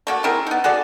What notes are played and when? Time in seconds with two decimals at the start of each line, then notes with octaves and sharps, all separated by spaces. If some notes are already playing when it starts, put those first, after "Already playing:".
0.07 A3 A#3 F#4
0.24 C4 E4 G#4 A#4
0.47 B3 D#4
0.64 F#4 G#4 A4 D5